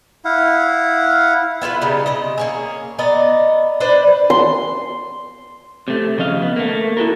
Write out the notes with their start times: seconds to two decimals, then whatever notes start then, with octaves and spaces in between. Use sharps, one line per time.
0.25 E4 F5 F#5
1.62 B3 E4 F4 B4
1.81 C#3 G3 C#4 D#4
2.06 C3 D#5
2.38 A#3 C#4 G#4
2.99 B3 A#4 D5 D#5
3.80 D4 B4 C5 D5
4.30 C6
5.88 C3 A3
6.18 C#3 F3 D#5 F5
6.42 B3
6.56 A3 A#3
6.97 E4 F#4 A4 A#4